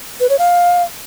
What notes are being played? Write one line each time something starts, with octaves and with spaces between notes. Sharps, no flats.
B4
C#5
F5